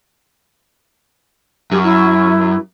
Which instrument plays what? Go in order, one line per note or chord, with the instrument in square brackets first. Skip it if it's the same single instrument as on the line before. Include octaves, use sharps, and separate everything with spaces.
[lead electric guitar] F#2 [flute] G4
[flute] E4